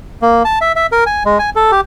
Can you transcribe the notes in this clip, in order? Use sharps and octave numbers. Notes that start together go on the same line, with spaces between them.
A#3
A5
E5
E5
A#4
G#5
G#3
G#5
A4
G4